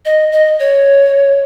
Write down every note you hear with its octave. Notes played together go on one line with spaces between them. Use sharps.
D#5
D#5
C#5